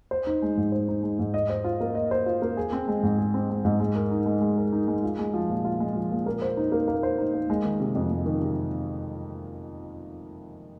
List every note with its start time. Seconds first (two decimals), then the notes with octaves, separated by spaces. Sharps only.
0.11 C5
0.27 D#4
0.42 G#3
0.57 G#2
0.72 C5
0.88 D#4
1.03 G#3
1.19 G#2
1.34 D#5
1.50 C5
1.64 F4
1.80 A#3
1.95 D#5
2.11 C5
2.26 F4
2.42 A#3
2.57 G#4
2.72 C4
2.88 G#3
3.03 G#2
3.18 G#4
3.34 C4
3.49 G#3
3.65 G#2
3.80 G#3
3.96 A#4
4.11 D#4
4.26 G#3
4.41 G#3
4.57 A#4
4.73 D#4
4.88 G#3
5.03 F4
5.19 G#3
5.34 F3
5.50 A#2
5.65 F4
5.80 G#3
5.95 F3
6.11 A#2
6.26 A#3
6.42 C5
6.57 D#4
6.72 A#3
6.87 A#3
7.03 C5
7.18 D#4
7.34 A#3
7.50 G#3
7.65 D#3
7.80 C3
7.95 F2
8.11 G#3
8.26 D#3
8.41 C3